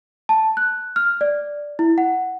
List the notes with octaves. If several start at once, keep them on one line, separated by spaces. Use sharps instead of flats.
A5
F#6
F6
D5
E4
F#5